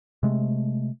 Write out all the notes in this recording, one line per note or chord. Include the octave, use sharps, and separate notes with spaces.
C3 G#3 A3